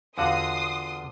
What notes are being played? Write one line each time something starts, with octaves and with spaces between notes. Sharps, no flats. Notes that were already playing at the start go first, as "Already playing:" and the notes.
E2 D3 F4 F#4 C6 D#6